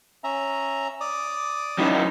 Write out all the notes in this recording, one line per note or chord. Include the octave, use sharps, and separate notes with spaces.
C#4 E5 A#5
D5 D6 D#6
F#3 C#4 D#4 E4 D#5